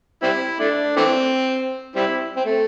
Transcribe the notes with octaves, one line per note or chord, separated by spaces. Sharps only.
G3 C4 E4
A3 D4
E3 A3 C4
G3 C4 E4
C4
A3